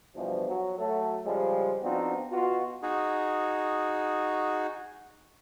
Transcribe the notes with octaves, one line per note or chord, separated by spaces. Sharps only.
G2 B2 E3 F3
F#3
F#3 A3 A4
C#3 F3 G3 G#3
F3 B3 C4 D4 D#4 F#4
B2 F4 F#4
D#4 F#4 G#4